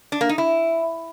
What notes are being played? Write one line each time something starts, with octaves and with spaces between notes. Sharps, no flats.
D4
A#3
D#4
E4